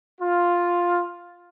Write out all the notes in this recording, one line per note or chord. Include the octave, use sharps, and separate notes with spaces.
F4